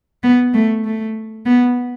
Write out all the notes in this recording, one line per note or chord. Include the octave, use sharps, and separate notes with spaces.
B3
A3
A3
B3